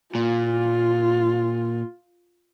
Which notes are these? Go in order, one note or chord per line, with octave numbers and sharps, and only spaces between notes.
A#2 F4